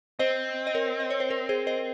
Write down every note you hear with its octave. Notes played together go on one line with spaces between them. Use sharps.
C4 C5 D#5
D#5
A#4 C#5
D#5
C#5
C5
A#4
G#4 C5
C5 D#5